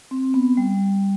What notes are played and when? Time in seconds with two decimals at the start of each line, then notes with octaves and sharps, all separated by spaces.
0.11 C4
0.34 B3
0.57 G3